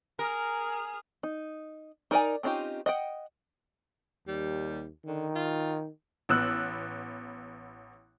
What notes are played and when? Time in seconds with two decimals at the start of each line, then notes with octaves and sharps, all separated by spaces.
0.19 G#4 A#4 F6
1.23 D#4
2.11 D#4 A#4 D5 E5 G#5
2.43 C4 C#4 D#4 F4 G4
2.86 D#5 F#5 G5
4.27 D#2 G3
5.06 D3 D#3
5.35 F4
6.29 A1 B3 E6 F#6